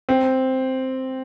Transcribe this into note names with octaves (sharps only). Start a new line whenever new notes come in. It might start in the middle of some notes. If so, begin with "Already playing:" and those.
C4